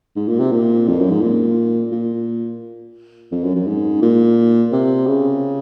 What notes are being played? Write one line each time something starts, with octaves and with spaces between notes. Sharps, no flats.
G#2
A#2
C3
A#2
F2
F#2
G#2
A#2
A#2
F2
F#2
F#2
G#2
A#2
C3
C#3